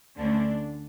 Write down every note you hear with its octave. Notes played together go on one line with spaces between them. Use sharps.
D2 D3 A3 C#4 D4